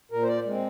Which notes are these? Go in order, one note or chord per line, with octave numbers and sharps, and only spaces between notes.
A#2 A#4
C5
D5
G#3 C4